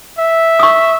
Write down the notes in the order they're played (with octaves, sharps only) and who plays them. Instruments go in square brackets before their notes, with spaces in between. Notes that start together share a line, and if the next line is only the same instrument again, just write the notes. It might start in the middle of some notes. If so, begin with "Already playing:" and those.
[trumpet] E5
[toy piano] C#6 D#6